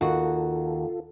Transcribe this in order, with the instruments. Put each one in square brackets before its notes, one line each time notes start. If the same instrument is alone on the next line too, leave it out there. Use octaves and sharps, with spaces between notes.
[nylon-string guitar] D#2 F#4 [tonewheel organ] F4 A4